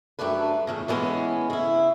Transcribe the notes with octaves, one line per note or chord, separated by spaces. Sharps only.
F#2 G3 A3 D4 B4
E2 A2 C#3
E3 G3 G#3 B3 C#4
C#3 E4